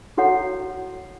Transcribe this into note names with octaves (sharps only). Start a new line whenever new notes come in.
E4 F#4 A4 C#5 F#5